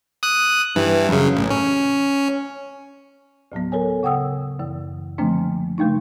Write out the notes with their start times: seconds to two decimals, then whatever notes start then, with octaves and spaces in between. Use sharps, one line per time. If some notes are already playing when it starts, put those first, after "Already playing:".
0.23 D#6 F#6
0.75 G2 E3
1.08 F#2 C#3
1.36 A1
1.50 C#4
3.52 D2 A2 F#3 B3
3.72 A4 A#4 C#5 G#5
4.03 C#3 F#5 G5 D#6 E6
4.59 F#2 E3
5.18 D3 F3 A3 A#3 C4 D4
5.78 C#3 G3 A3 D4 D#4